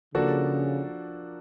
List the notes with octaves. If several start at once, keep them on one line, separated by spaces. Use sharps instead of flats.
C#3 F3 A#3 D4 F#4 A4